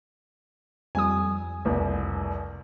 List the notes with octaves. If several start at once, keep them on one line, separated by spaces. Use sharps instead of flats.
F2 G3 G#5 D#6
F1 C2